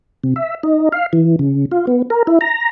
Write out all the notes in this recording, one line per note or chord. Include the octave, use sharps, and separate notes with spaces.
C3
E5
D#4
F5
E3
C#3
F4
B3
A#4
E4
A#5